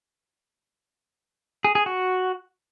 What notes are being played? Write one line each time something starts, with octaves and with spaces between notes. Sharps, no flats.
G#4
G#4
F#4